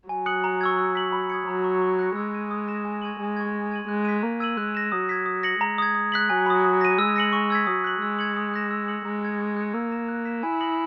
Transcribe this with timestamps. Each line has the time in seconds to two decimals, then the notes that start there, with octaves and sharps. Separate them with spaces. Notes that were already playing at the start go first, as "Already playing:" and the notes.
0.09 F#3 G#5
0.26 D#6 F#6 C#7 F#7
0.44 A#5
0.61 C#6 E6 G#6
0.78 E6
0.95 B6 F#7
1.12 B5
1.30 D#6 G#6 C#7
1.47 F#3 A#5
1.64 C#6 E6
1.82 C#6
1.99 F#6 A#6 C#7
2.16 G#3 E6
2.33 G#6 D#7
2.51 D#6
2.68 A#6 E7
2.85 G#5
3.02 C#6 G#6 D#7 F#7
3.19 G#3 G#5
3.37 C#6 G#6
3.54 C#6
3.71 G#6 D#7 F#7
3.88 G#3 F#6
4.05 B6 D#7
4.23 A#3 A#5
4.40 E6 G#6 D#7 F#7
4.57 G#3 F#6
4.75 A#6 E7
4.92 F#3 D#6
5.09 G#6 B6
5.26 D#6
5.43 A#6 C#7 F#7
5.60 G#3 A#5
5.78 D#6 G#6
5.95 D#6
6.12 F#6 B6 F#7
6.30 F#3 G#5
6.46 B5 D#6
6.64 D#6
6.81 A#6 D#7
6.98 G#3 E6
7.16 A#6 C#7 F#7
7.33 C#6
7.50 E6 G#6 B6
7.67 F#3 D#6
7.84 F#6 B6 F#7
8.01 G#3 E6
8.19 G#6 C#7 F#7
8.37 D#6
8.54 F#6 A#6 E7
8.71 E6
8.88 G#6 C#7 F#7
9.05 G#3 A#5
9.22 E6 G#6 C#7
9.40 C#6
9.57 F#6 C#7
9.74 A#3 E6
9.91 A#6 E7
10.09 F#6
10.25 B6 E7
10.43 E4 G#5
10.60 D#6 A#6 C#7 F#7